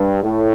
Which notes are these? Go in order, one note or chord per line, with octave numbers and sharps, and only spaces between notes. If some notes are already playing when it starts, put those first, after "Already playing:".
Already playing: G2
A2